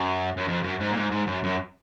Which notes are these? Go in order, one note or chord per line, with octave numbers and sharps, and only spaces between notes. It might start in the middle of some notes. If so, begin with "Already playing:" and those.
Already playing: F#2
F#2
F2
F#2
G#2
A#2
G#2
G#2
F#2
F#2